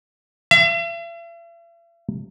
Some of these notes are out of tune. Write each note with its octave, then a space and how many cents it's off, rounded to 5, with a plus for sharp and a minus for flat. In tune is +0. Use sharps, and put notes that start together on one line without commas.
E5 +45